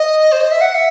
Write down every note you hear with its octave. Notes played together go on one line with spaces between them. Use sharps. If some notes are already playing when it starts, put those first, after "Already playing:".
Already playing: D#5
C5
D#5
E5
F#5
E5